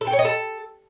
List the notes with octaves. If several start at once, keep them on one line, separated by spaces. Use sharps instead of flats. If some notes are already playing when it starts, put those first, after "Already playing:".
A4
G5
C#5
D#5
A4